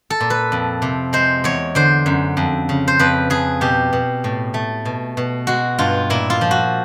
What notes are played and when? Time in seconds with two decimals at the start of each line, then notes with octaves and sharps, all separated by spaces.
0.10 A4
0.20 A#2
0.30 B4
0.52 F2
0.82 C3
1.13 G#3 C5
1.44 E2 C#5
1.75 D3 C5
2.06 F#2
2.37 F2
2.69 C#3
2.88 C5
2.99 F2 B4
3.30 F2 G#4
3.61 B2 G4
3.93 B2
4.24 A2
4.54 A3
4.85 B2
5.17 B2
5.47 G#3 F#4
5.79 G2 F4
6.10 A#2 E4
6.30 F4
6.41 F3
6.51 F#4